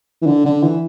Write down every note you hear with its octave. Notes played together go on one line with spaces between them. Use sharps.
E3
D3
D3
E3